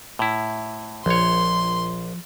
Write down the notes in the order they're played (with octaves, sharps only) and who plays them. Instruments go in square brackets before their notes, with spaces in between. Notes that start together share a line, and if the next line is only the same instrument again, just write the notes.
[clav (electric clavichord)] A2 E4
[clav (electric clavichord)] A#1 C#5 [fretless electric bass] F3 [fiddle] C6